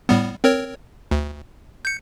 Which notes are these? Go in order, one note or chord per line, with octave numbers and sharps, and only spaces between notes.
A2 G3 B3
C4 A#4 C#5
D2
G6 C#7